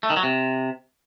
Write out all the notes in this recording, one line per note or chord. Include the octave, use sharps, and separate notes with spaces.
A3
D#3
F#3
C3